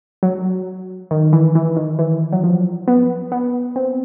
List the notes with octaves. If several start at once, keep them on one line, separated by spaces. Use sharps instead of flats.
F#3
D#3
E3
E3
D#3
E3
F#3
F3
B3
B3
C4